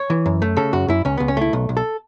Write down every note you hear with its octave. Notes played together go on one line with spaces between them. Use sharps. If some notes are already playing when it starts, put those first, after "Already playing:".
Already playing: C#5
E3
F#2
A3
C#3 A4
F#2 F#4
F#2 E4
C#2 C#4
C#2 B3
C#4
A3 E4
B1
B1
A4